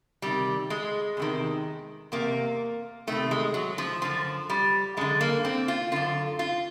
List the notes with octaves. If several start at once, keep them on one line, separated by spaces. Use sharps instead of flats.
E2 C3 D#3 G3
G#3
E2 C3 D#3
E2 C3 A#3
E2 C3 D#3 A3
G#3
F#3
F3
F#2 D3 F3
G3
F#2 D3 G#3
A#3
C4
F4
F#2 D3 F4
F4